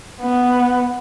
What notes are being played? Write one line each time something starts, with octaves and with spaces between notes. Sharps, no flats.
B3